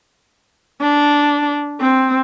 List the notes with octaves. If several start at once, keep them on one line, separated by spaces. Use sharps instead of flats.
D4
C4